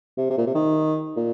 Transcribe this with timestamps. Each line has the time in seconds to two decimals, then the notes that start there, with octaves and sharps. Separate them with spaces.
0.17 C3
0.30 C3
0.38 A#2
0.47 C3
0.54 D#3
1.16 A#2